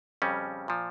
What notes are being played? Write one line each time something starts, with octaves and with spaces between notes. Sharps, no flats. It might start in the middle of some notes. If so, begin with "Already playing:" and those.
F2 C#3 G3 C#4
A#2 F3